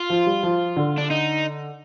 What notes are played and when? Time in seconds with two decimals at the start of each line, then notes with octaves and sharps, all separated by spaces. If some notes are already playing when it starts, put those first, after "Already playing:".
Already playing: F4
0.10 F3
0.26 G3
0.43 F3
0.76 D3
0.98 D4
1.10 D#4